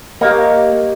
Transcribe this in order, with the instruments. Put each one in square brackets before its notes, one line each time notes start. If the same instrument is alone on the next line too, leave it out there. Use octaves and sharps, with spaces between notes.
[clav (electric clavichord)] A#3 [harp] G4 C#5 D#5